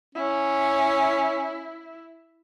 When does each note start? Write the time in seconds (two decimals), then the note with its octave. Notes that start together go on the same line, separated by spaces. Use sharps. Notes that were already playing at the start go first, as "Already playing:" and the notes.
0.15 C#4 E4